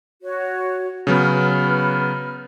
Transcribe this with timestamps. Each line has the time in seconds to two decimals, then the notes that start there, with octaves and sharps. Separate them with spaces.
0.23 F#4 C#5
1.07 C#3 F#3 B3 B4 B5 F6